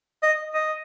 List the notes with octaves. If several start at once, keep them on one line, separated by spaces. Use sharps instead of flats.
D#5
D#5